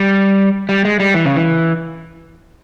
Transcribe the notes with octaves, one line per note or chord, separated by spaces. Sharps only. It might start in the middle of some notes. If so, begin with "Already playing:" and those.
Already playing: G3
G3
G#3
G3
E3
C#3
E3